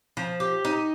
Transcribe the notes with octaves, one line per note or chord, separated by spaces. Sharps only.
F3
G4
D#4